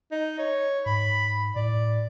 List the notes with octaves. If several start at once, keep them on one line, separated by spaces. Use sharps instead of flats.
D#4
C#5
G#2 B5
A2 D5